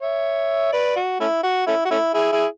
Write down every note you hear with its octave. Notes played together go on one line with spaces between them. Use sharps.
C#5 E5
B4 D5
F#4
A3 C#4 E4
F#4
A3 C#4 E4
F#4
A3 C#4 E4
E4 G#4
E4 G#4